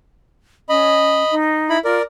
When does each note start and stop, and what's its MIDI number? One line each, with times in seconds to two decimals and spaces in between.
0.69 1.24 61
0.69 1.35 75
0.69 1.35 83
1.31 1.77 63
1.70 1.79 64
1.70 1.79 83
1.85 1.99 65
1.85 2.02 70
1.85 2.02 74